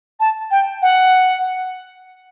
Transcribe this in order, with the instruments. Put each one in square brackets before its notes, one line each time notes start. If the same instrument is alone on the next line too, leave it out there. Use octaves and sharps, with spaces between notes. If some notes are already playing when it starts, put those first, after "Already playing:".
[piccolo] A5
G5
F#5